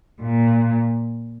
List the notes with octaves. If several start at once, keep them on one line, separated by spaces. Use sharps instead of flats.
A#2